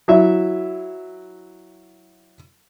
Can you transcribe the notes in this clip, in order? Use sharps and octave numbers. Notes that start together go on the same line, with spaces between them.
F#3 E4 E5